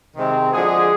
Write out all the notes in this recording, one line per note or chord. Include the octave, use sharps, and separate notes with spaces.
C3 D#3 G#3 C4
D3 F3 G#3 F#4 G#4